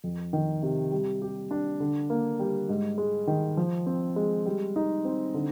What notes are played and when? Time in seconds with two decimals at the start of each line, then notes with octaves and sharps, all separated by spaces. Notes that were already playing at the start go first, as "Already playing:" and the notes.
0.04 F2
0.33 D#3
0.63 C3
0.92 G3
1.22 G4
1.51 D4
1.80 D3
2.10 A#3
2.39 G3
2.69 G#2
2.98 G#3
3.27 D#3
3.57 F3
3.86 C4
4.16 G#3
4.46 G3
4.76 D#4
5.05 C4
5.34 D3